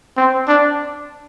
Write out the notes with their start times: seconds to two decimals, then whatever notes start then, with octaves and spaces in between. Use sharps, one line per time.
0.17 C4
0.48 D4